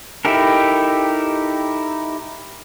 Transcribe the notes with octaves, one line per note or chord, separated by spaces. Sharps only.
D#4 E4 G4 A4 A#4